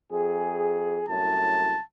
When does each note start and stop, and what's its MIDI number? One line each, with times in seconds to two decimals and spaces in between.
0.12 1.03 41
0.12 1.03 68
1.08 1.74 36
1.08 1.74 42
1.08 1.74 45
1.08 1.82 81